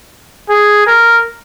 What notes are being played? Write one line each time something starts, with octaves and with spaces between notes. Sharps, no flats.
G#4
A#4